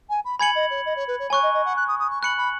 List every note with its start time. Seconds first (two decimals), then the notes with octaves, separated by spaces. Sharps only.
0.09 G#5
0.25 B5
0.39 G#5 B5 G#6 C#7 F#7
0.55 D#5
0.70 C#5
0.86 D#5
0.96 C#5
1.08 B4
1.19 C#5
1.30 C#5 G#5 C#6 F#6
1.43 D#5
1.54 D#5
1.65 F#5
1.76 F#6
1.88 D#6
1.99 D#6
2.11 C#6
2.22 B5 F#6 C#7 F#7
2.37 B5